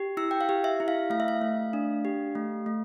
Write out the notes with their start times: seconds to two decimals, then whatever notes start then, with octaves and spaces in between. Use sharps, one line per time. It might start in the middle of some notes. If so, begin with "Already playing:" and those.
Already playing: G4
0.17 E4 E6
0.31 G5
0.41 F5
0.49 G4
0.64 E5
0.80 E4
0.88 F5
1.10 A3 F5
1.20 E5
1.28 F5
1.41 A3
1.73 D4
2.05 G4
2.35 A3
2.66 A3